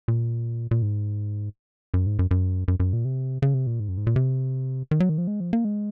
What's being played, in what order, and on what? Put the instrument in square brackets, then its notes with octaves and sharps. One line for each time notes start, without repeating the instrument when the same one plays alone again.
[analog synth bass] A#2
A#2
G#2
F#2
G#2
F#2
F#2
F#2
F#2
A#2
C3
C#3
C3
A#2
G#2
F#2
G#2
A#2
C3
D#3
F#3
D#3
F3
G#3
F3
A#3
G#3